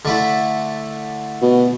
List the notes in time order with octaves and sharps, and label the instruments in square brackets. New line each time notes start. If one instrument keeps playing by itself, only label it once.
[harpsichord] D3 A3 E4
[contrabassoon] B2